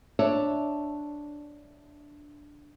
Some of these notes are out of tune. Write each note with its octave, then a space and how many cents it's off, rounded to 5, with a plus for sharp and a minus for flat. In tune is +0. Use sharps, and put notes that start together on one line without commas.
D4 +0 C#5 +0 E5 +0